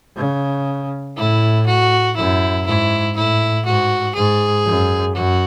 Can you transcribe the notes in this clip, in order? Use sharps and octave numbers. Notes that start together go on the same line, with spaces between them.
C#3
A2 E4
F#4
F#2 E4
G#2 E4
A2 E4
G#2 F#4
G#2 G#4
F#2
F#2 F#4